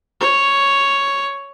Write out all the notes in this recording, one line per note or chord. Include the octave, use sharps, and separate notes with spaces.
C#5